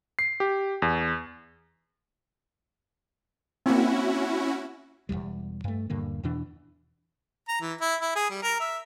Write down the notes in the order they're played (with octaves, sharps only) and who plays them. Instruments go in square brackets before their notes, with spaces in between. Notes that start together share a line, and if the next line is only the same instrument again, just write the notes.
[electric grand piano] C7
G4
E2
[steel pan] A#3 C4 [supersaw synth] C#4 E4 F#4
[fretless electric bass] E1 B1 E2 G3
G2 A3
D#1 G2 D3 A#3
E2 B2 E3 D4
[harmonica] A#5
E3
E4
E4
G#4
G3
A#4
E5